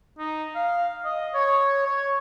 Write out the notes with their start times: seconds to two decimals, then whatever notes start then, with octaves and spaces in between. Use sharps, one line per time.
0.19 D#4
0.56 F5
1.05 D#5
1.35 C#5
1.86 C#5